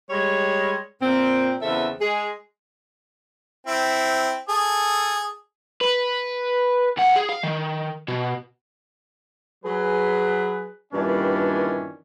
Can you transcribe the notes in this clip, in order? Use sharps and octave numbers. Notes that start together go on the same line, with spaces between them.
G3 G#3 C#5
A#2 C4
E2 C#3 C4 A4 E5
G#3 G#4
C4 E4
G#4 A4 D#6
B4
C#2 F#5
G#4
F5
D#3
B2
F#3 G#4 B4
G2 A#2 D#3 E3 C#4 D4